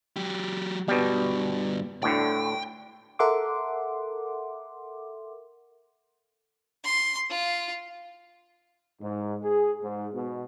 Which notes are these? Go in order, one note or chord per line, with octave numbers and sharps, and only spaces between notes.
F#3 G4
G2 B2 G3 B3
D2 A2 D3 G5
A4 A#4 E5 F#5 C6 D6
C6
F4
G#2
G#4
G#2
B2